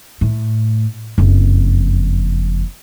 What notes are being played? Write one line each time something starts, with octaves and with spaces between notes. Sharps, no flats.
A2
F#1 F2